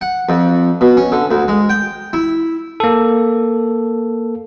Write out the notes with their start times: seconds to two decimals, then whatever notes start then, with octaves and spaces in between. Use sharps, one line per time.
0.01 F#5
0.29 F2
0.81 B2
0.97 C#4
1.12 D3
1.31 D2
1.48 G#3
1.69 G5
2.13 E4
2.80 A#3 A4